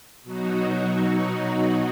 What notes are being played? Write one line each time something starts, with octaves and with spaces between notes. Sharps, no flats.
B2 F#3 D#4 F#4